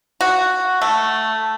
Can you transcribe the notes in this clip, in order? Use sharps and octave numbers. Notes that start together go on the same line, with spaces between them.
F#4
A3